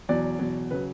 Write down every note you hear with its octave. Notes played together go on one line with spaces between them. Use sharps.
E2 B2 F#3 D5
E2 B2 F#3
C#3 F#3 B4